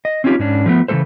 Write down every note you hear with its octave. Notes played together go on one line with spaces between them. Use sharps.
D#5
C4 C#4 D#4 F4 G4
G#2 C#4 D4
F3 A3 B3
C#3 E3 G3 A3 A4 C5